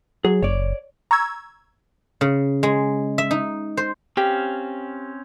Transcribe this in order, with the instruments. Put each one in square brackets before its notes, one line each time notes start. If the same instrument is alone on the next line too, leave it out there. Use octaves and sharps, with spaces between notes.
[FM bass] F#3 [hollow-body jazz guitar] G#4
[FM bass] F#1 [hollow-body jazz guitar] C#5 D5
[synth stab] A#5 C#6 E6 G#6
[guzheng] C#3
G#3
E5
D#4
C5
[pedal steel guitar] C4 C#4 F5 [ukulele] G4